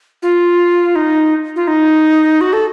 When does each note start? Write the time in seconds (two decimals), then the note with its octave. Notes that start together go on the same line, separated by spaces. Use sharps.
0.22 F4
0.95 D#4
1.56 F4
1.67 D#4
2.41 F#4
2.53 A4